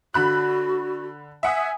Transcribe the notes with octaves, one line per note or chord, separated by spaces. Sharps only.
D3 F#4 B5 F#6
E5 F#5 G#5 D#6